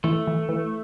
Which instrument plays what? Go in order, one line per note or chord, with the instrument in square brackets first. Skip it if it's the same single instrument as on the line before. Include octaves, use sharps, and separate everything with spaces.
[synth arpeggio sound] E3 [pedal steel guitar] A3
[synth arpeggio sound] E3
E3